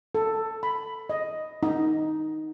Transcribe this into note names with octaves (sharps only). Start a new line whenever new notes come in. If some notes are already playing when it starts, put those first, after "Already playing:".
A4
B5
D#5
D#4